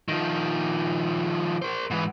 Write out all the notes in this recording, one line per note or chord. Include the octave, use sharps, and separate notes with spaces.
D#3 F3
A#4 C5
G#2 E3